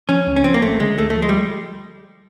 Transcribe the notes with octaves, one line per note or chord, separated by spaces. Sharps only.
F3 C#4
C#2
C#4
F3 C4
A#3
G#1 A3
D3 G#3
D2 A3
A3
F3
G#3
G3